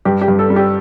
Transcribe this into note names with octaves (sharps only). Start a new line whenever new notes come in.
G2 G4
G4
G2
A4
G3
G4